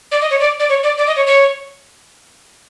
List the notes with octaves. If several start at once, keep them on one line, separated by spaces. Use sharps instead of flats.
D5
D#5
C#5
D5
D5
C#5
D5
D5
D#5
C#5
C#5